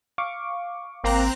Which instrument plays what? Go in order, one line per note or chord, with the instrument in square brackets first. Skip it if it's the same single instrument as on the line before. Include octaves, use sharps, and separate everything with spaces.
[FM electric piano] F5 C#6 D6
[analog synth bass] G#1 [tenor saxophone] A#3 [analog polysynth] C4 A#5 F#6